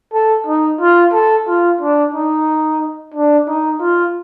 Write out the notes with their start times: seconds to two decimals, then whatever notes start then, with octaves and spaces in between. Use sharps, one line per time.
0.14 A4
0.47 D#4
0.81 F4
1.13 A4
1.47 F4
1.81 D4
2.14 D#4
3.14 D4
3.48 D#4
3.80 F4